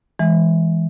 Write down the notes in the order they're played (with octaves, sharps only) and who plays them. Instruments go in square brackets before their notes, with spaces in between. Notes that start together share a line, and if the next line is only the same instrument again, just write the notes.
[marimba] E3 G#3